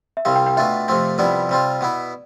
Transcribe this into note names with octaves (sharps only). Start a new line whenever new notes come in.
E5
C2 C3 G3 C4 F5
G5
G5
B2 A3 D4 F4 E5
F2 C3 F3 A3 C4
F2 C3 G3 B3 E4 D5
C3 G3 C4 F4
B2 B3 E4